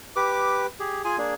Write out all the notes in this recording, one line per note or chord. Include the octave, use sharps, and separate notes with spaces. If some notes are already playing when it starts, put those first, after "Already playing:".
G4 B4 D6
G4 G#4
F4 G#4 G#5
A#3 D4 G#4